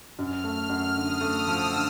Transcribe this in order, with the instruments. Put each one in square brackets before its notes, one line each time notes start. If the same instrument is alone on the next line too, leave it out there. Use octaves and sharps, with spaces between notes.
[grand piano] F#2 [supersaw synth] F6
[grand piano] A3
[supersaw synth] F6
[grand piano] F#2
[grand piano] D3 [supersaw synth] D#6
[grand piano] A3
[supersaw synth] E6
[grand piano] F3
D3